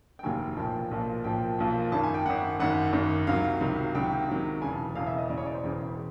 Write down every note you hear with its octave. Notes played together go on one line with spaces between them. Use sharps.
G5
F1 D#2 D#3 F#3 G#5
B1 A#2 F3 G5
B1 A#2 F3
B1 A#2 F3 G5
B1 A#2 F3
G#1 F#2 D#3 A5
G#5
G5
G#1 F#2 D#3 F#5
G#1 F#2 D#3 F#5
G#1 F#2 D#3
C#2 C3 D#3 F#3 F5
C#2 C3 D#3 F#3
C#2 C3 D#3 F#3 G5
C#2 C3 D#3 F#3
E1 E2 C#3 G#5
A5
E1 E2 C#3 F5
E5
D#5
E1 E2 C#3 D5
C#5
D5
C5
E1 E2 C#3